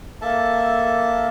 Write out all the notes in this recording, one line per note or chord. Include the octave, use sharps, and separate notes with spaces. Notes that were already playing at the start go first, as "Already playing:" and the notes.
A#3 A4 E5 A5